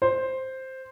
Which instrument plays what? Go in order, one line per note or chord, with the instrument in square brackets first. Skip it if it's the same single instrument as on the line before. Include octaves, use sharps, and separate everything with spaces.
[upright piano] C5